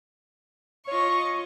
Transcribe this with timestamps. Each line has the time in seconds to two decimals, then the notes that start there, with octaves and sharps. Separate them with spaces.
0.88 F4 C#5 D#5 C#6